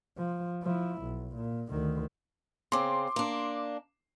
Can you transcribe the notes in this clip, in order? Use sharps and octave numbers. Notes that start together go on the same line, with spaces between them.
F3
F3 E4
B1
A#2
D2 D#3
C#3 C4 C6 D6
A#3 D4